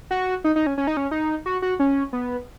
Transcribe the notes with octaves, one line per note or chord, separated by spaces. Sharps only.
F#4
D#4
D#4
C#4
C#4
D#4
C#4
D#4
F#4
F#4
C#4
B3